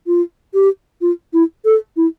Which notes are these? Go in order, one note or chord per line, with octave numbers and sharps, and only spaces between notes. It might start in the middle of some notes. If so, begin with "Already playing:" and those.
F4
G4
F4
E4
A4
E4